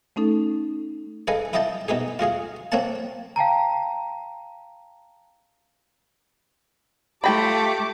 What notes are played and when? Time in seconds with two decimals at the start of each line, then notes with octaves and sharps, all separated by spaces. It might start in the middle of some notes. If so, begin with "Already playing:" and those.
0.16 A3 C#4 D#4 A4
1.28 G#4 A4 B4 D#5 F5
1.53 E4 G4 D#5 F5 G5 A5
1.88 B2 D#4 G4 G#4
2.19 F4 F#4 G#4 F5
2.72 A#3 C4 C#5 F5 F#5 A5
3.36 F5 G5 A5 A#5
7.24 A3 F4 G4 G5 A5 B5 D6